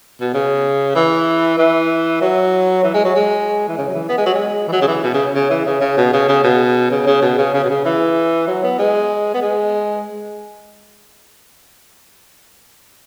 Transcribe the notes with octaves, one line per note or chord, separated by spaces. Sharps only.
B2
C#3
E3
E3
F#3
E3
G#3
F#3
G#3
E3
C#3
F#3
E3
B3
G#3
F#3
G#3
E3
F#3
C#3
E3
B2
C#3
C#3
E3
C#3
C#3
B2
C#3
C#3
B2
C#3
C#3
B2
C#3
C#3
B2
C#3
E3
F#3
B3
G#3
B3
G#3